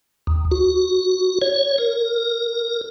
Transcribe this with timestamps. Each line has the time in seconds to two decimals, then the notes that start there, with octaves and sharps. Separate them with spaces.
0.27 D#2
0.51 F#4
1.42 C#5
1.78 A#4